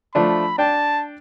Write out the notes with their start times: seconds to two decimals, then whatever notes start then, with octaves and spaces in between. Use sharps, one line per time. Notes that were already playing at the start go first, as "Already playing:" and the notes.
0.15 F3 A3 D4 B5
0.58 D4 G5 A5